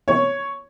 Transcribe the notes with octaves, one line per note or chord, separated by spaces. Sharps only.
C#5